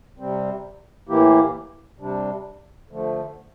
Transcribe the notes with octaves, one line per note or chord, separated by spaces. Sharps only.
C3 G3 C4
A2 E3 A#3 E4 G4
C3 G3 D4
D3 F3 A3